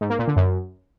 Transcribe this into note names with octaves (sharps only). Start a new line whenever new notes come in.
G#2
A#3
A#2
D3
F#2